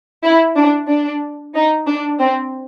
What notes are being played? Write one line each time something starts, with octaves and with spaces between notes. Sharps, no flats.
E4
D4
D4
D#4
D4
C4